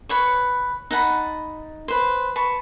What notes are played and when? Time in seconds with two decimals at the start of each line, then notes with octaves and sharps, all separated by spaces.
0.09 B4 C#5 C#6
0.91 D#4 F#5 A5 B5
1.88 B4 C5
2.36 B4 A5 C#6